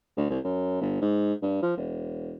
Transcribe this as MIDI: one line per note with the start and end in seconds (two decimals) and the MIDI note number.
0.17 0.27 38
0.30 0.39 36
0.44 0.80 42
0.81 0.97 31
1.02 1.33 44
1.42 1.62 43
1.62 1.73 53
1.77 2.38 28